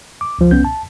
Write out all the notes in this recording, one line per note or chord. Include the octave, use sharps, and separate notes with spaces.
D6
C#2 F3
C2 B3 C#4 G6
A5